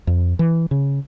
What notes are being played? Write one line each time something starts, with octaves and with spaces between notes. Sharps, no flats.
F2
E3
C#3